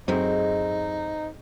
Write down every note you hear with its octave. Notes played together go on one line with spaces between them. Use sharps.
F#2 A2 G#3 C4 D#4 B5